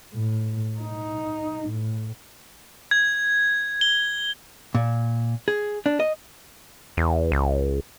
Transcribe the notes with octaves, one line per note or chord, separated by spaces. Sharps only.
A2
D#4
A2
G#6
G7
A#2
G#4
D4
D#5
E2
C#2